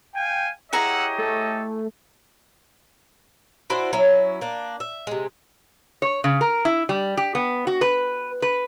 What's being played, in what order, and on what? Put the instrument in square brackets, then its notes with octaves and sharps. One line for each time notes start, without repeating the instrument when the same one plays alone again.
[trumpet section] F5 G5 [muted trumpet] G#5
[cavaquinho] E4 G#4 A#5 [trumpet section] G4 C#5 D#5 [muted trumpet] F#5 [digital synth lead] E6
[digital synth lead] A3 [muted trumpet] A4
[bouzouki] D4 E4 F#4 C5
F#3 C#4 E4
A#3 D4
E5
C3 G#3
[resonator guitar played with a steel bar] C#5
C#3
A#4
E4
G3
G4
B3
F#4
B4
B4